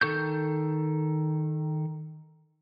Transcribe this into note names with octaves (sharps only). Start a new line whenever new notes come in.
D#3 A4 C#6 G6